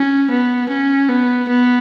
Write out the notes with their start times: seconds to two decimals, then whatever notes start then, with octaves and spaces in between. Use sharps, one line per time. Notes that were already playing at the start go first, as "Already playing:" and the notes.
Already playing: C#4
0.30 B3
0.69 C#4
1.09 B3
1.49 B3